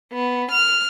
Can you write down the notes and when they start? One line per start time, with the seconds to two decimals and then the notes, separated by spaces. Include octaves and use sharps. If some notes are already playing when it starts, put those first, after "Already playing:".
0.12 B3
0.51 F6